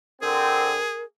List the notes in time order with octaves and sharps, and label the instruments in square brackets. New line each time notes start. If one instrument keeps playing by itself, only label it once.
[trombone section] D3 C4 [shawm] G#4 [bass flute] A#4